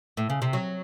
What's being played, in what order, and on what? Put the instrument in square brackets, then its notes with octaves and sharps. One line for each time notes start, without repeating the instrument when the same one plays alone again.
[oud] A2
C#3
C3
F#3